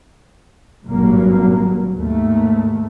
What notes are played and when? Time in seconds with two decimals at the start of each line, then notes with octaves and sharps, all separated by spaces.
0.88 G#1 G2 A#2 F#3 A#3
1.94 D#2 G#2 A3